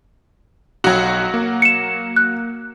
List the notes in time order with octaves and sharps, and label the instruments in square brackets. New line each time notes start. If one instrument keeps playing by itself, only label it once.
[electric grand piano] B1 [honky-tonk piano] F#3 F#4
[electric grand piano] A#3
[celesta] C#7 E7
F#6